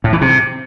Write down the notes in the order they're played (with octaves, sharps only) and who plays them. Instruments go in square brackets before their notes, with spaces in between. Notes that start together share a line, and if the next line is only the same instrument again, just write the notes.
[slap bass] A2
E3
C3